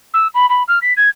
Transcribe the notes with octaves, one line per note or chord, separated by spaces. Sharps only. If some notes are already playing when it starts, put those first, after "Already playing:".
E6
B5
B5
F6
B6
G#6